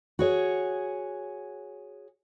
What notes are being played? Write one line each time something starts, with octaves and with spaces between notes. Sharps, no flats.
F#4 G#4 C#5